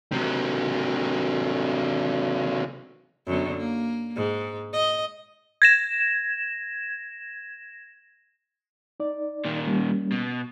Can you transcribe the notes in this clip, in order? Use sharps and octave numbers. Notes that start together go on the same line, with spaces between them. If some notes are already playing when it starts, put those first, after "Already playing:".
C3 F#3
F#2 D3 B3
A#3
G#2
D#5
G#6 A#6 E7
D#4 D5
A#2 D#3
G3 A#3 C#4
B2